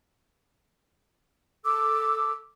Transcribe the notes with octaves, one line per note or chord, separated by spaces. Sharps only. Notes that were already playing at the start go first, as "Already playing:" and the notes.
A4 D6 E6